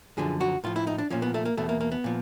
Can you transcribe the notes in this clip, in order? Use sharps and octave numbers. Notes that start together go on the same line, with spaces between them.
F#2 D3 F3 G#4
F#4
A2 F3 F4
E4
D#4
D4
A#2 F3 C#4
B3
A3
A#3
E2 B2 A3
A#3
A#3
B3
A#2 F3